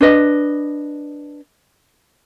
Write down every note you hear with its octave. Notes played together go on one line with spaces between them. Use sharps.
D4 B4 D#5